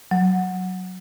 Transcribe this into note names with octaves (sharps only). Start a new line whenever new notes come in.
F#3